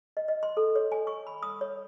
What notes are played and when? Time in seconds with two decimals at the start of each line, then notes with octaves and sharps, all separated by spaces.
0.17 D#5
0.28 D#5
0.43 C6
0.57 A4
0.76 C#5
0.92 G#5
1.07 C#6
1.27 B5
1.43 D#6
1.61 C#5